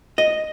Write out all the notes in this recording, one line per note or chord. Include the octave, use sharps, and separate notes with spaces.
D#5